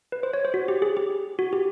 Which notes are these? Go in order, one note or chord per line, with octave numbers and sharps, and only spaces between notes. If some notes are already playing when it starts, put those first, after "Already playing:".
B4
C5
C#5
C5
F#4
G4
G#4
G4
F#4
G4